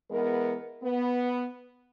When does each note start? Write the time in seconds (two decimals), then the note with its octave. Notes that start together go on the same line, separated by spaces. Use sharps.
0.11 E2 G#3 B3 A#4
0.83 B3